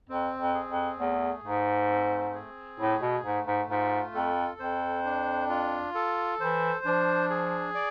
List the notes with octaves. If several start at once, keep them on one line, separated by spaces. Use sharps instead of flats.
F2 C4
F2
G#4
F2
E2 A3
G#2 A3
C4
G#4
A2 A3
B2
G#2 A3
G#2
G#2 F4
F2 A4
F2 C5
D4
F4
A4
E3 C5
F3 D4
G#4
D5